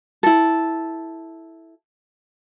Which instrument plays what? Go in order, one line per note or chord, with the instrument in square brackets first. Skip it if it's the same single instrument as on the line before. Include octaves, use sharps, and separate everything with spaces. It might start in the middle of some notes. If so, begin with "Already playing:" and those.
[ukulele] E4 A4